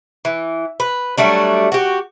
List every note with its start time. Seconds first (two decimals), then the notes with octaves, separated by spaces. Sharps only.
0.25 E3
0.80 B4
1.18 F#3 G3 A3 D4
1.72 F#4 G4